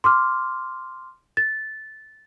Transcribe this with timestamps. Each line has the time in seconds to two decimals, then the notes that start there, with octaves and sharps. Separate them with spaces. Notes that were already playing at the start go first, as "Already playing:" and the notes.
0.04 C6 D6 F6
1.37 A6